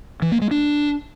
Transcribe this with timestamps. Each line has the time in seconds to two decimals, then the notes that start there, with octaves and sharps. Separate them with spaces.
0.22 E3
0.32 A#3
0.41 G#3
0.51 D4